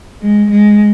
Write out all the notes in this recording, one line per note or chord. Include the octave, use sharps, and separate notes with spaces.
G#3
G#3